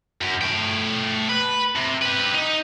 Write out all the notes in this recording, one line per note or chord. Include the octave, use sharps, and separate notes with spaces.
F#2
A3 G5
B4
C3
G4 B4
D#4